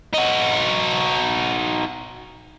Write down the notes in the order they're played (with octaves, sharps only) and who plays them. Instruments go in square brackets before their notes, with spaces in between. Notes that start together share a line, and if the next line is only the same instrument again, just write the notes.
[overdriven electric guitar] D#4 F#4